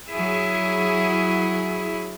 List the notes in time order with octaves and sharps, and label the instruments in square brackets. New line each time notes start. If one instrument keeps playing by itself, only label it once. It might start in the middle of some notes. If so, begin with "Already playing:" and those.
[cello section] F#3 E4 G#4